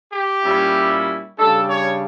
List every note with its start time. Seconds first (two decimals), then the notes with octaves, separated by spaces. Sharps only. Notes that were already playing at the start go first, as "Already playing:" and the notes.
0.11 G4
0.44 A#2 G3 C#4 E4
1.38 C#3 G3 D4 A4
1.69 C#5